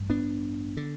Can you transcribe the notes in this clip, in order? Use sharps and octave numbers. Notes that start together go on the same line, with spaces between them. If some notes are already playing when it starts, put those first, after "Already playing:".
Already playing: A1 G2
B3 D4
D3